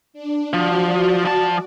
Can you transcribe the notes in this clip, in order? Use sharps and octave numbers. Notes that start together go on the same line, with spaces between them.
D4
F3 F#4 D5
F3 A5